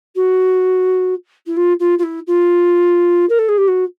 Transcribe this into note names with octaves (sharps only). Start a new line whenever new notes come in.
F#4
E4
F4
F4
F4
E4
F4
A#4
A4
G#4
G4
F#4